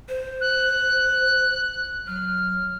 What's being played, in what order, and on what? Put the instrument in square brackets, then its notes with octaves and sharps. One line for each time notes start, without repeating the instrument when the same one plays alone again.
[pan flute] C5
[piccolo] F#6
[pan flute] F#3 [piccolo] F6